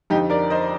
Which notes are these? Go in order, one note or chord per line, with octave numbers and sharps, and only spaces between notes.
F2 D3 F3 D#4 G4
A#4 D5
C5 D#5